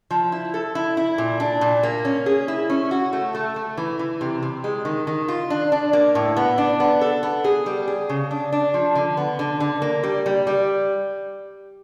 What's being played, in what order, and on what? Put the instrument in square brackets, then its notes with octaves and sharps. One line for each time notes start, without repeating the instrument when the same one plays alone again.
[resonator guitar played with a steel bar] F3
E4
A4
E4
E4
A#2
D4
A#2
A#3
C#4
G#4
E4
C#4
F#4
A3
A3
A3
E3
E3
C3
C3
G#3
D#3
D#3
F4
D4
D4
A#3
A2
B3
D4
B3
A4
B3
G#4
G3
G#4
C#3
D4
D4
F3
D3
B3
D3
D3
A#3
G3
G3
G3